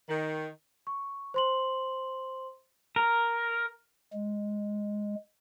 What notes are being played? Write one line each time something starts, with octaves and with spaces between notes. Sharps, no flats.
D#3
C#6
C5 C6 F#7
A#4
G#3